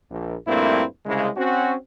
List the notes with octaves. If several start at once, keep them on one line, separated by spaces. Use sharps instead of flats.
A#1
A#1 G2 A3 A#3 C4 E4
C2 C#3 G#3
C4 C#4 F#4